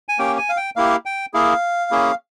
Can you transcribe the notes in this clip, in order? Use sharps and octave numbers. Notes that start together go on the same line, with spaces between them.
G#5
A#3 C#4 G4 G5
G#5
F5
G5
A#3 E4 G4 F5
G5
A#3 E4 G#4 F5
A#3 C#4 E4 G#4